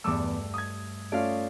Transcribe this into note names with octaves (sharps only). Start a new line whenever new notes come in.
E2 G2 A3 D6 E6
D#6 G#6
A3 C#4 F4 D5 F5